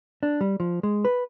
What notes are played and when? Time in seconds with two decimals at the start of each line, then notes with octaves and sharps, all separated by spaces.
0.23 D4
0.41 G3
0.60 F3
0.83 G#3
1.05 B4